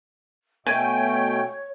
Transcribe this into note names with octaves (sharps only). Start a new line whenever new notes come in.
B2 A3 C#5 G5 G#5